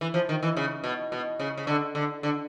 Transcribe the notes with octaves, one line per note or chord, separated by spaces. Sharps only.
E3
F3
D#3
E3
C#3
B2
B2
C#3
C#3
D3
D3
D3